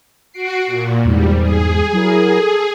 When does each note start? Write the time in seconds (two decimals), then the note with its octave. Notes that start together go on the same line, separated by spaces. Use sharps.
0.34 F#4 C7 D7
0.66 A#2
1.05 E2 G#2 G3
1.38 G#4
1.92 F#3 E4 A#4
2.38 A4